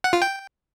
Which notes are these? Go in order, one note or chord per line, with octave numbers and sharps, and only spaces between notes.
F#5
F4
G5